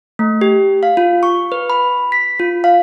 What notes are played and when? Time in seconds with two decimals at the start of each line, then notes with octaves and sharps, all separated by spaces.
0.19 A3
0.41 G4
0.83 F5
0.97 F4
1.23 C#6
1.52 B4
1.70 B5
2.12 B6
2.39 F4
2.64 F5